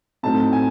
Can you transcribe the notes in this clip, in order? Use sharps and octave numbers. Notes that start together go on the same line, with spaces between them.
A2 F#3 A3 C4 D#4 A5
G#5